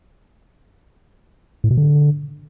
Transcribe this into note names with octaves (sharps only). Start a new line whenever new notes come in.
A2
B2
D3